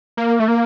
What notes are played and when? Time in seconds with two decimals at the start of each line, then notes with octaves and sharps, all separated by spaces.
0.17 A#3
0.40 A3
0.48 A#3